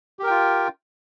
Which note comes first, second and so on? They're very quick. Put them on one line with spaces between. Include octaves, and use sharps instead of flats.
G4 A#4 G5 F4